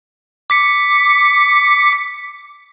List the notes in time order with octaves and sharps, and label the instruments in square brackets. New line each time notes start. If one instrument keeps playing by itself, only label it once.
[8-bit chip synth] D6 B6 C#7